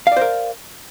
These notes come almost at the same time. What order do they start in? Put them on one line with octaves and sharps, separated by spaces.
F5 D5 C5 A#4